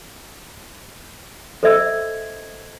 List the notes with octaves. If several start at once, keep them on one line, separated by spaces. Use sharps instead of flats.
A4 C5 D#5 E5 E6 G#6